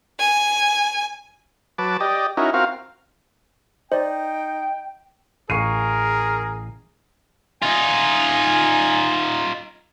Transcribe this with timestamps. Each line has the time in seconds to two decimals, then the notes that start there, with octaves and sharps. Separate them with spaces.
0.20 G#5
1.78 F#3 B4 A5 D6
2.00 G4 D5 D#5
2.37 C#4 D#4 E4 F#4 A#4
2.54 C4 F4 F#4 A#4 F5
3.92 D#4 C5 D5 G5
5.50 A1 G#4 A#4 F5 G#5 C#6 C7 D#7
7.62 D#4 F4 G#5